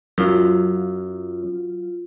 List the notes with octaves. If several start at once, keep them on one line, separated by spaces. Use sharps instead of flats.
F#2 F#3 F4